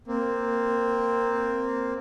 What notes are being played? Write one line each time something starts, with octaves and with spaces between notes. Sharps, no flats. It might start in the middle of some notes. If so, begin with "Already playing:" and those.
A#3 C4